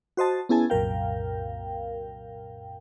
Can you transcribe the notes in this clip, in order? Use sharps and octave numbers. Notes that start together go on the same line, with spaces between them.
F#4 C5 D#5 A5
B3 C#4 E4 G#4 G#5 A5
C2 F#2 A#2 A#4 F5 G5